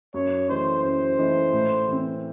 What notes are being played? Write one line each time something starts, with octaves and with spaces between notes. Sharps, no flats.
F#2 C#5
E3 A3 D#4 C5
F#2 C5
E3 A3 D#4
A2
E3 C4